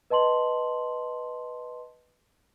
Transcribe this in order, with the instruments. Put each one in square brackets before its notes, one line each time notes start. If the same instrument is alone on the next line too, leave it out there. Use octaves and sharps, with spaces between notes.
[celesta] B4 D#5 A5 C6 F#7